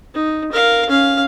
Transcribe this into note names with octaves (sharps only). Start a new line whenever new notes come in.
D#4
A#4 F5
C#4 F5